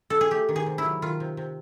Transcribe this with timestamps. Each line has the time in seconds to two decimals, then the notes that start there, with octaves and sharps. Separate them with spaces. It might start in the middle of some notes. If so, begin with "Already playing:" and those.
0.10 A4
0.21 G#4
0.31 A3 G4
0.49 D#3
0.56 G#4
0.66 C3
0.78 E4
0.85 F#3
1.02 D#3 F4
1.20 C3
1.37 C3